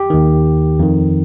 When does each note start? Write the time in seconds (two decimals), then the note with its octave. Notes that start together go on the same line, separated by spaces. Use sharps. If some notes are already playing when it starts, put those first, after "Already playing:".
Already playing: G4
0.10 D#2 D#3
0.79 F2 D#3